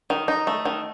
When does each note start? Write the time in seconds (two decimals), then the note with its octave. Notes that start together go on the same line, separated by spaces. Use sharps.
0.10 D#3
0.28 D#4
0.47 A3
0.65 D#3